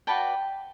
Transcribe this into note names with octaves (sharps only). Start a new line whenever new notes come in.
F#4 B4 D5 G5 A5